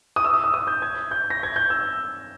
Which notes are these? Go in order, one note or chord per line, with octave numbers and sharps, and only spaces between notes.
D#6
E6
D#6
D#6
D#6
G6
G#6
G6
A#6
G#6
G6
E6